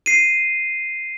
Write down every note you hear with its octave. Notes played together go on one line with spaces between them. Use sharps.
C7 D#7